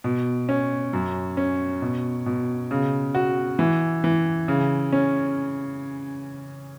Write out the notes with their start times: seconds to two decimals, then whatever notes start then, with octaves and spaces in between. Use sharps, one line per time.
0.04 B2
0.49 C#4
0.93 F#2
1.37 C#4
1.82 B2
2.26 B2
2.71 C#3
3.15 F#4
3.59 E3
4.04 E3
4.48 C#3
4.93 C#4